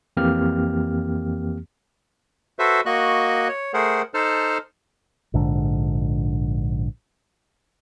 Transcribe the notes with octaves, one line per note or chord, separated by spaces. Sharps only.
F2 E3 A#3 C4 G4 F6
F#4 A4 B4 C5 E5
A#3 F#4 D#5 C#6 F#6
C#5
A3 G#4 A#4 C5 F#5
D#4 A4 C5 A5 F6
A#1 G#2 D3